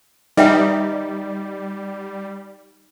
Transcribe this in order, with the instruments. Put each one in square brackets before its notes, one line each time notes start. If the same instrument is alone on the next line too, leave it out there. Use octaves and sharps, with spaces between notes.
[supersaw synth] G3 [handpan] D#4 [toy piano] B4 E5 G5